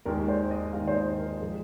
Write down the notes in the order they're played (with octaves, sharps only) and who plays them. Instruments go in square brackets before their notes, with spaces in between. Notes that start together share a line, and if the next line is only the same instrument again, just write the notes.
[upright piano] D#2 D#3 G#3 A#4
C5
D#5
D#2 D#3 G#3 F5
C5
D#5
A#4
F3 G#3 G#4